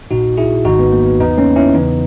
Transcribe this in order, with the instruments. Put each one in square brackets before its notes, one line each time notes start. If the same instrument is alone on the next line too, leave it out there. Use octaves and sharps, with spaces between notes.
[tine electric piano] A#1 A#2 D#4 F#4
E4 G#4
G#1 G#2 D#3 D#4 F#4
B3
A#3
B3
E2 C#3 E3 B3 D#4
A#3 C#4
C#4 E4
E2 C#3 E3 B3 D#4